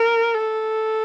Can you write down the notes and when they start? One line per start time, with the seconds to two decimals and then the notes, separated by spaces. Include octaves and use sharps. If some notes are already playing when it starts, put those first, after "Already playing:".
Already playing: A#4
0.34 A4